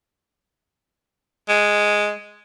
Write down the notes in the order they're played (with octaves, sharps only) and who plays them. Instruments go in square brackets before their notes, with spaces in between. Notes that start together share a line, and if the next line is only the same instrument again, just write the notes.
[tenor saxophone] G#3